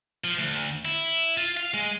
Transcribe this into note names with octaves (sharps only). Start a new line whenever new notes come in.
F3
D2
E4
F4
F5
G#3